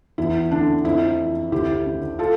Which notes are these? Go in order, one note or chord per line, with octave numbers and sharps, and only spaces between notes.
E2 E4
D3 D4
F2 E4
E3
D2 E4 G4
D3
F4 A4